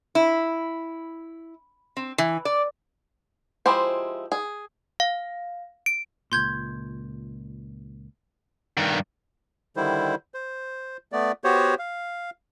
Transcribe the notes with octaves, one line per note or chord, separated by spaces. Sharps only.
E4
C4
E3
D5
F3 G#3 E4 G4 C5
G#4
F5
D7
C#2 A#2 C6 G6 G#6
G2 D#3
D3 D#3 G3 E4 C5
C5
A3 B3 D5
B3 F#4 G4 C5 C#5
F5